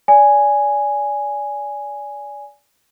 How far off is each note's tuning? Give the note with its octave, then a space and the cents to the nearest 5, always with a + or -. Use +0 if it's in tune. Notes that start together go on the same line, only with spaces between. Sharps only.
D5 -30 G#5 +0